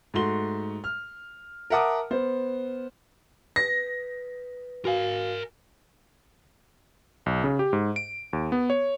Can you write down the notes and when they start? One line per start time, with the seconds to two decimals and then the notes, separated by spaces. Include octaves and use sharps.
0.14 G#2 A3 F#4 C6 G7
0.84 F6
1.70 A#4 E5 F#5 A5 D6 D#6
2.10 B3 C5
3.56 B4 A#6
4.85 F#4 A#4 F5 G#5
7.26 B1
7.44 C#3
7.59 G4
7.73 G#2
7.96 D7
8.33 D#2
8.52 B3
8.70 C#5